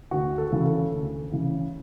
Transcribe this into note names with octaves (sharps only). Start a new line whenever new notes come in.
D2 F#4
A4
C#3 E3
A4
D2
C#3 E3